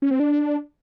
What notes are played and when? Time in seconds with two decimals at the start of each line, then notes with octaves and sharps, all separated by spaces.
0.02 C#4
0.11 C4
0.20 D4